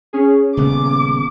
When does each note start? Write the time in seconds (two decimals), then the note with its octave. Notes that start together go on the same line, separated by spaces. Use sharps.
0.13 C#4 G#4
0.57 D#1 C#3 B3 D6